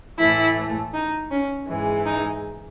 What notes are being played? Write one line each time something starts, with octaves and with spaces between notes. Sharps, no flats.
A2 E3 A3 E4
D#4
C#4
G#2 E3 G#3
D#4